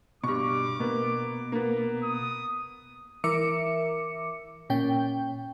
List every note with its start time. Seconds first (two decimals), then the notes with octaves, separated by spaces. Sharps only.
0.24 G2 B2 C#6 D6
0.80 B2 A#3 B3
1.52 A#3 B3
2.03 D#6
3.24 E3 A#4 E5 D6 C#7
4.70 A#2 C#4 G5